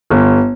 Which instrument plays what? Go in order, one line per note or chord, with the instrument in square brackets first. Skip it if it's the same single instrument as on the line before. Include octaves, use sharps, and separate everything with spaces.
[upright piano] G1